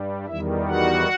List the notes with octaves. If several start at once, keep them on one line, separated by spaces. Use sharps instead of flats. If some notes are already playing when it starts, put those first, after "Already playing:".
Already playing: G2 G3
E2 D#3 G3 E4 E5
F#4 F#5